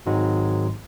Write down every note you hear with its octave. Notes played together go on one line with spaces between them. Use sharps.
G#1 G#2 D#3 F#3 G#3